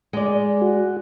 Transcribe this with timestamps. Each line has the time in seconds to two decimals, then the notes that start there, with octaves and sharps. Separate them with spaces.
0.13 G#3 D5
0.61 F#4